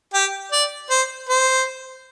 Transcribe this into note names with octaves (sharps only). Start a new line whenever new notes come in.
G4
D5
C5
C5